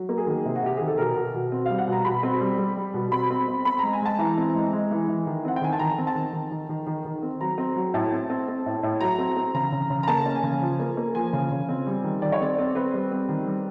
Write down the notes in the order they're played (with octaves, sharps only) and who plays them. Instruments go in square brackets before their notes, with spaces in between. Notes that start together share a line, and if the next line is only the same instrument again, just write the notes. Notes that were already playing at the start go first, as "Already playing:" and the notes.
Already playing: [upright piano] F#3
A#3
G#4
D#3
C3
F#4
C3 G4
D#3 G#4
A4
B2 A#4
B2
B2
C4
G3 F5
F#5
B2 A#5
B2 B5
C4
G3
G3
G3
B2
C4 B5
C4
C4
C4 B5
G#3 A#5
G#5
G#3 A5
E3 A#5
C4
G#3
G#3
E3
E3
D#3
C4 F#5
G5
D#3 G#5
A5
D#3 A#5
C4
A5
D#3
D#3
D#3
D#3
D#3
D#3
C4
F#3 A#5
C4
F#3
A2 A5
C4
C4
C4
A2
A2
F#3 A#5
C4
C4
C#3 A#5
C#3
C#3
A#5
A#3 A5
C#4
G#5
C#3
F3
A#3
A#3
F3 G#5
C#3
C#3
C4
G3
D#3
D#3 D5
C#5
C4 D5
C4
C4 B4
G3
C4
D#3
G3